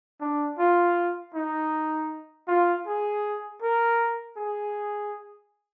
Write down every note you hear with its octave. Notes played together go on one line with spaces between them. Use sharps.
D4
F4
D#4
F4
G#4
A#4
G#4